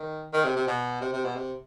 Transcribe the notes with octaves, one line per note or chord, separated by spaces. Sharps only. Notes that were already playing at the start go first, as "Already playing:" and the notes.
Already playing: D#3
D#3
C3
C3
B2
C3
C3
B2
C3